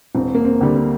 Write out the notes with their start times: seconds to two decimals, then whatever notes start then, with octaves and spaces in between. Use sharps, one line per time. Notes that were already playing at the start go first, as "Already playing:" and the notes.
0.15 E1 C4
0.35 A#3
0.45 C4
0.61 D2 D3 G3
0.75 A#3